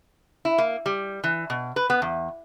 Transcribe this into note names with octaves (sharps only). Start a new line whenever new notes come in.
E4
A#3
G3
E3
B2
B4
B3
E2